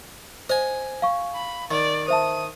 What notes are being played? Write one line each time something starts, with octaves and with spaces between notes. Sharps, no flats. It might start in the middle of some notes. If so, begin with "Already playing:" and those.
C5 D#5 G#5
F5 C#6
B5
D#3 D5
C5 E5 A5 D#6